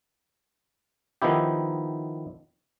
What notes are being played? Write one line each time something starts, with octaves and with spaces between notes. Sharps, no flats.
D#3 F3 B3 D#4 E4 G4